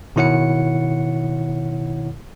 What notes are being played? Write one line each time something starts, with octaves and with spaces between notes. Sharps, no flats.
B2 D#3 E4 C#5 F#5 C#7